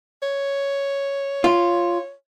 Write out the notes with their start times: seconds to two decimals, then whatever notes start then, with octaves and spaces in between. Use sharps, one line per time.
0.22 C#5
1.44 F4